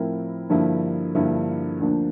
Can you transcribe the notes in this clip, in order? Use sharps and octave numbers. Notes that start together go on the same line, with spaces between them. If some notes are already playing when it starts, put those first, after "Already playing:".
Already playing: A2 F3 C4 E4 A#4
G2 D3 F3 A#3 E4
G2 D3 F3 A#3 E4
D2 D3 F3 A#3 D4